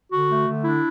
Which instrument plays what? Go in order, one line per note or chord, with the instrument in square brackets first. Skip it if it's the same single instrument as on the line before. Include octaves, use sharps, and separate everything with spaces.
[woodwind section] D3 F#4
A3
D3
D4 E4